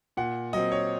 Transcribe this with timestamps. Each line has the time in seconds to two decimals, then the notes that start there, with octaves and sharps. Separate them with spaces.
0.17 A#2 F#5
0.53 F#3 C4 D#5
0.72 C#5